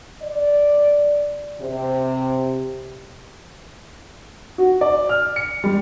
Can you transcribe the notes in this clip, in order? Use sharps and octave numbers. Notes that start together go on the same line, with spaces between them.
D5
C3
F#4
D5
F6
C#7
G3